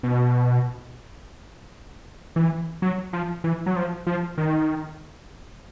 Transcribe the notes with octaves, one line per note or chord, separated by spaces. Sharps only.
B2
E3
F#3
F3
E3
F#3
F3
F3
D#3